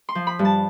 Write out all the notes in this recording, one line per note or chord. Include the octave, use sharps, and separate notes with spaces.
C6
F3
B5
G2
A5